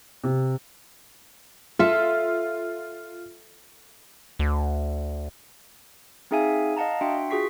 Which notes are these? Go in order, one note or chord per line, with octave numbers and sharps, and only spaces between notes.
C3
F4 A4 E5
D2
C4 D#4 G#4 E5 F5 G#5
D#5 F5 F#5 A5 A#5
D4 F#4 E5 F#5 G5 C6
F4 F#4 G#4 C#6 B6 C7